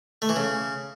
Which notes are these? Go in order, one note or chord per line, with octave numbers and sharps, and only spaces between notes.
A3
E3
C#3